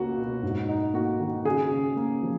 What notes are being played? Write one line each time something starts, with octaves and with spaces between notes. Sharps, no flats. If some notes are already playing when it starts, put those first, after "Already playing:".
Already playing: C#2 A#3 C#4 F#4
B2
G#2
D#4
A#3 F#4
D#3
C#3 G#4
C#3
A#3
F3